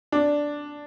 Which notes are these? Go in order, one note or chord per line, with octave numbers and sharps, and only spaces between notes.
D4